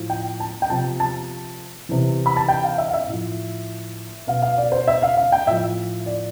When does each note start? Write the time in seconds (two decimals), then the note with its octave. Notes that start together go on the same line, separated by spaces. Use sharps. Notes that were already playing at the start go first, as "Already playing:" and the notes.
Already playing: A2 F3
0.10 G5
0.40 A5
0.62 G5
0.70 C3 F3 A5
1.00 A5
1.89 C3 E3
2.26 B5
2.37 A5
2.48 G5
2.64 F5
2.78 E5
2.90 F5
2.94 E5
3.08 A2 F3
4.27 B2 F5
4.42 F5
4.58 D5
4.72 C5
4.88 E5
5.02 F5
5.17 F5
5.32 G5
5.46 A2 F3 E5
6.06 D5